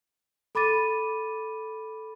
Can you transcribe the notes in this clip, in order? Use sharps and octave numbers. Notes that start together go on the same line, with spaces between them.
A4 B5 D6 A6 D#7